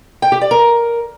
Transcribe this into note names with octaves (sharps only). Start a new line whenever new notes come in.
G5
G4
D5
A#4